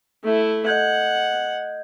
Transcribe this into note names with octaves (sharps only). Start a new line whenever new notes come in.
A3 E4
D#5 F#5 G6 G#6